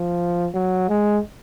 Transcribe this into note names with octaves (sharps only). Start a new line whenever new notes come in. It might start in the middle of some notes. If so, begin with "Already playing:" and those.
Already playing: F3
F#3
G#3